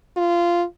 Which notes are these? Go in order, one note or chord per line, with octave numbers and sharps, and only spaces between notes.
F4